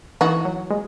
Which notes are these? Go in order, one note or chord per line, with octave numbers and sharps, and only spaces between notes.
E3 D#4 F#4
F#3
G#3